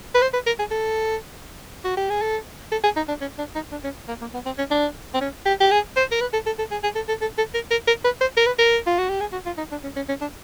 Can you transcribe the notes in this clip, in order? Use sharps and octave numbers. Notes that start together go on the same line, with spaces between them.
B4
C5
B4
A#4
G#4
A4
F#4
G4
G#4
A4
A4
G#4
D#4
D4
C#4
D4
D#4
D4
C#4
A#3
A#3
B3
C4
C#4
D4
C4
C#4
G4
G4
G#4
C5
A#4
B4
A4
A4
A4
G#4
G#4
A4
A4
A4
A4
A#4
A#4
A#4
B4
C5
A#4
B4
A#4
F4
F#4
G4
G#4
F#4
F4
D#4
D4
C#4
C#4
C#4
D4